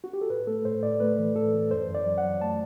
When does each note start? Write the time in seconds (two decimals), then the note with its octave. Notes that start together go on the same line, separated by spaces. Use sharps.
0.04 F#4
0.13 G4
0.21 A4
0.30 A2 B4
0.47 A3 A4
0.65 A2 C5
0.83 A2 D5
1.00 A3 B4
1.19 E3
1.35 A2 A4
1.54 E3
1.71 F#2 C5
1.89 F#2
1.94 D5
2.06 F#3
2.18 F#5
2.23 F#3
2.41 A3 A5